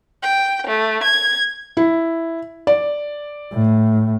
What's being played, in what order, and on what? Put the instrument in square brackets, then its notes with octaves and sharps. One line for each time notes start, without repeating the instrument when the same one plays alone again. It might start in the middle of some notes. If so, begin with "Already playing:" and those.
[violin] G5
A3
G#6
[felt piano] E4
D5
[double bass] A2